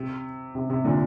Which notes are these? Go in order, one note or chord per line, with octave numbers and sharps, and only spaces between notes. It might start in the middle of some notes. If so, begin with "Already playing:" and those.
Already playing: C3
C3
C3
A#2 D3